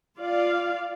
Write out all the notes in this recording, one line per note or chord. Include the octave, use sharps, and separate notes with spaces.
F4 D5 F5